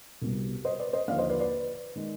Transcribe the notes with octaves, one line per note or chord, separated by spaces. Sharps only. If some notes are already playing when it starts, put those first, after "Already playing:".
C2 B2 G3
C5 D#5
B4 D5
C5 D#5
D#2 D3 F3 D5 F5
C5 D#5
B4 D5
B4 D5
D#3 G#3